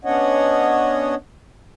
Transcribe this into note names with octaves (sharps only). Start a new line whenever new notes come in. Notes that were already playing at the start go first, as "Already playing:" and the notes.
B3 C#4 D4 C#5 D#5 F#5